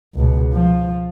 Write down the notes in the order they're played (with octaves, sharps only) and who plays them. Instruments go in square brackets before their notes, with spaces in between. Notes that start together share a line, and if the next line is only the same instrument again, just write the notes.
[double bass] C#2 B2
F3